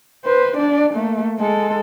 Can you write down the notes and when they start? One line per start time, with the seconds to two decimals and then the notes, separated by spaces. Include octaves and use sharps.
0.25 B4 C5
0.57 D4 D5
0.94 A3 A#3
1.40 G#3 A4